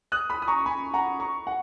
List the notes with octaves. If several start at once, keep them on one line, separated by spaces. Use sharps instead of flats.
D#6 F#6
B5 D#6
D#6
A#5 C#6
G#5 B5
F#5 A#5
A#5 C#6
F#5